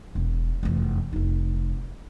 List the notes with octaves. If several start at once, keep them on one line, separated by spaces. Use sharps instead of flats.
E1
F1 E2
F1 D#4